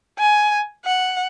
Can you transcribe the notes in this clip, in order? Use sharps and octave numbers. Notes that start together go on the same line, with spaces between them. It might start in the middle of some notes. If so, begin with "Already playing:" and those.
G#5
F#5